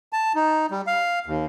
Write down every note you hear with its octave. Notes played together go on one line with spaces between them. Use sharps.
A5
D#4
G3
F5
D#2